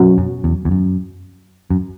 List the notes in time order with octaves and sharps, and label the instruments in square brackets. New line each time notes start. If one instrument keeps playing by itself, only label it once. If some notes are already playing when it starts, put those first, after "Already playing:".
Already playing: [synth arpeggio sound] B2 F#3 C#4 F#4
[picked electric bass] F#2
E2
E2
F#2
F#2